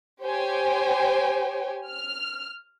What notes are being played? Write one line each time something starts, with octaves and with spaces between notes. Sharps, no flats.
G4 C5 C#5 G5 G#5
F6